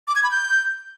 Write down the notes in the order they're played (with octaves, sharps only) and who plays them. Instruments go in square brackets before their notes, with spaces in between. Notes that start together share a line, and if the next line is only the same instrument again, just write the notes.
[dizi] D6
G#6
B5
G6